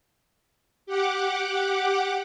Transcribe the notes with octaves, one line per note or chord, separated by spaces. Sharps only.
G4 F#5 D6